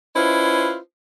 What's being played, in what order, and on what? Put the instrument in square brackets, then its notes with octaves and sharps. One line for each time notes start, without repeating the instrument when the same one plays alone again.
[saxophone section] C#4 E4 F4 B4 C5 D#5